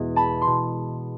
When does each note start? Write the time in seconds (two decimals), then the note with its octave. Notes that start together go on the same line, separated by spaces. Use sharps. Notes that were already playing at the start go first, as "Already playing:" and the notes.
Already playing: E2 B2 G#3
0.16 A5 B5
0.42 C6
0.47 B2